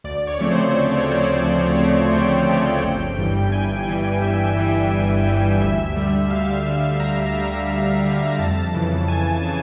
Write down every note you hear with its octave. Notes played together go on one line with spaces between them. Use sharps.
D2 D5
C#5
C#3 F3 A3 C4
C5
D2 C#5
C#5
C#3 F3 A3 C4
D5
D2
C#3 F3 A3 C4
D2 G5
C#3 F3 A3 C4
G1
G2 E3 G3
G1 G#5
G2 E3 G3
G1 E5
G2 E3 G3
G1
G2 E3 G3
D2 E5
D3 G3
D2 F5
D3 G3
D2 A#5
D3 G3
D2
D3 G3
F2 A5
C#3 E3
F2 G#5
C#3 E3